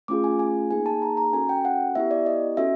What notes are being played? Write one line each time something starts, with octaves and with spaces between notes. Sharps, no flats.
A3 C#4 F4 G#4 D6
G#5
G#5
A#3 D#4 G#4 G#5
A5
A#5
A#5
C#4 F#4 A4 G#5
G5
F#5
B3 E4 G4 E5
D5
D#5
C#4 F#4 A4 E5